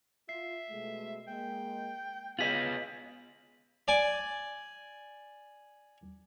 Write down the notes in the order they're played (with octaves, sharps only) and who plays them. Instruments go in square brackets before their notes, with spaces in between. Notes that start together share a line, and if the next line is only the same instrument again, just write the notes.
[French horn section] F4 [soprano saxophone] E5 [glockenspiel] C7
[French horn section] B2 G#3 A3
[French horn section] G#3 A#3 [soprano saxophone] G5
[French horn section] B3 [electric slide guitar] F4 G#4 D#5 [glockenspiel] B6 F#7
[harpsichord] D5 G#5